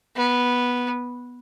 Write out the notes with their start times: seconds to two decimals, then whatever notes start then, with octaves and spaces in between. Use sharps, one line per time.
0.16 B3